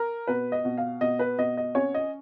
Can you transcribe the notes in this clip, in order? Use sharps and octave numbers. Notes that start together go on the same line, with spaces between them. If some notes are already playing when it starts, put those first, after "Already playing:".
Already playing: A#4
B2 B4
D#5
B2
F5
B2 D#5
B4
B2 D#5
D#5
C#4 C#5
D#5